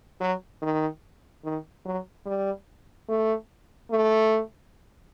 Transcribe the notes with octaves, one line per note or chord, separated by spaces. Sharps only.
F#3
D#3
D#3
F#3
G3
A3
A3